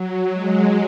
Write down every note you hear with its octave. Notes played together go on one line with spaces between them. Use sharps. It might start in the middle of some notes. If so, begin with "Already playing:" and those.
Already playing: F#3
G#3